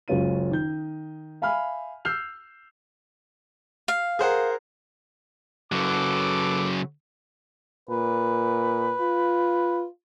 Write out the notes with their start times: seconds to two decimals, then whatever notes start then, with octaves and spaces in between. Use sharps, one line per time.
0.08 F#1 C#2 F#2 C#4 F4 D#7
0.51 D#3 G6
1.42 E5 F5 G#5 B5 F6
2.05 E6 F6 G6 C7 F7
3.88 F5
4.19 G#4 A#4 C5 F#5
5.72 C#3 F#3 A4 B4 D6
7.89 A#2 B4
9.00 F4